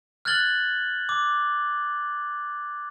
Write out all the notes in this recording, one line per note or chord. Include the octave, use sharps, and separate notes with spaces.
F6 F#6 G#6 A6 F#7 G7
D6